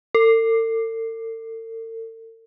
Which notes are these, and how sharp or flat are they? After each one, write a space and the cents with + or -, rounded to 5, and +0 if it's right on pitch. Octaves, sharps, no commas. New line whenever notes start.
A4 +45